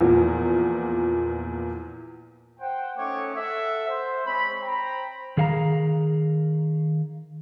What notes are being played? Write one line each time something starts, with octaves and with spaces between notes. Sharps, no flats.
E2 A#2 F3
C5 F#5 G5
A3 C#4 D#4 C#5 D6
A4 E5 F#5
C5
G#3 C4 C#5 B5
C5 G5 A#5 B5
D#3 G#4 F5 F#5 A#5